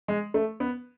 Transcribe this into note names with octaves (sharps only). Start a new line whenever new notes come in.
G#3
A3
B3